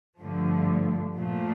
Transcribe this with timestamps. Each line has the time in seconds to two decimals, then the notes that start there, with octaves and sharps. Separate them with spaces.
0.19 G2 D3 F3 A3
1.17 A#2 F3 A3